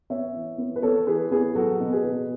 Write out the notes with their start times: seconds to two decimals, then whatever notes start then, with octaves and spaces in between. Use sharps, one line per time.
0.10 B3 C#5 E5
0.35 E3
0.58 B3
0.76 B4
0.82 B3 A4 C#5
1.07 E3 G#4 B4
1.31 B3 G#4
1.55 F#3 F#4 A4
1.80 B2
1.92 G#4 B4
2.04 B2